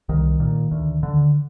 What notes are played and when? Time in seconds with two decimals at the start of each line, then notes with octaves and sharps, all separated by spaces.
0.09 C2 D#3
0.40 A#2
0.71 D2
1.03 D3